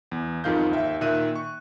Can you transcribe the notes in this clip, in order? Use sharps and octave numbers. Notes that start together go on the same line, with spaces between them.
E2
F2 G#2 D#3 F4 F5 G6
D#2 E5
A#2 D#3 E5 F#6 D#7
C#6